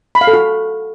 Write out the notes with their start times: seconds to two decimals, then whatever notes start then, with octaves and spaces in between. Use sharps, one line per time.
0.15 B5
0.21 F5
0.27 A4
0.33 F#4